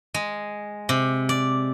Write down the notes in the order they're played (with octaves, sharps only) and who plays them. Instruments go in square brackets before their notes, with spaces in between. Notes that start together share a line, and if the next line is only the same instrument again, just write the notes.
[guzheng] G#3
C3
D5